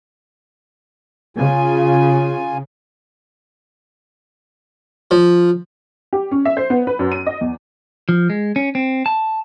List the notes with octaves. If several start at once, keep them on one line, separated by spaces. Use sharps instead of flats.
C#3 F4 G#5
F3
G4
C#4
E5
C5
B3
B4
F#2
D#7
D#5
E2
F3
G#3
C#4
C4
A5